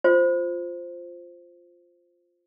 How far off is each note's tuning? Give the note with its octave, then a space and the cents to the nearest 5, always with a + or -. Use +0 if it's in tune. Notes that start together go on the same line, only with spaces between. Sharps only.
F4 +0 C5 +0